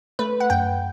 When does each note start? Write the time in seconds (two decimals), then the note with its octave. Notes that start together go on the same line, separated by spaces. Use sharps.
0.19 A3 B4
0.40 F#5
0.50 F#2 G5